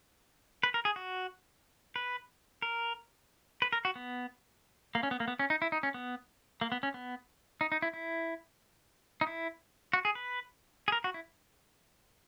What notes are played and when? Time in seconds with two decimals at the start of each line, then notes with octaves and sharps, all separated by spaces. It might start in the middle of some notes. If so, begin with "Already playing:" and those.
0.63 B4
0.74 A#4
0.85 G#4
0.96 F#4
1.96 B4
2.62 A#4
3.62 B4
3.73 A#4
3.85 F#4
3.96 B3
4.95 A#3
5.03 C#4
5.11 B3
5.20 A#3
5.28 B3
5.39 C#4
5.50 D#4
5.62 E4
5.72 D#4
5.83 C#4
5.94 B3
6.61 A#3
6.72 B3
6.83 C#4
6.94 B3
7.61 D#4
7.72 D#4
7.82 E4
7.94 E4
9.21 D#4
9.27 E4
9.93 F#4
10.05 G#4
10.15 B4
10.88 G#4
10.92 A#4
11.04 F#4
11.14 E4